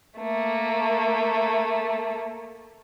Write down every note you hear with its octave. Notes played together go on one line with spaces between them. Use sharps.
A3 A#3